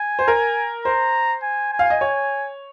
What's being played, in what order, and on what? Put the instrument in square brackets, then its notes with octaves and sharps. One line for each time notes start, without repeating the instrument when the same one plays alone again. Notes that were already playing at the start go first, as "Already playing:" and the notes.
Already playing: [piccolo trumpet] G#5
[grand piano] C5
A#4
[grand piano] C5 [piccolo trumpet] A#5
[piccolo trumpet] G#5
G#5
[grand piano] F5
D#5
C#5